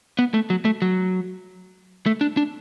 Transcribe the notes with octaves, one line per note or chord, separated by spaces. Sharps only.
B3
A3
F#3
A3
F#3
A3
D4
D4